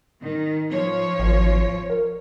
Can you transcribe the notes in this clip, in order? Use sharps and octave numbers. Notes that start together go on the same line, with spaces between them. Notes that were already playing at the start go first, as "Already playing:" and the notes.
D#3
F3 C#5
G#1
A#4